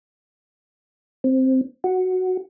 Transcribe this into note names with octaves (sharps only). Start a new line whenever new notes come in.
C4
F#4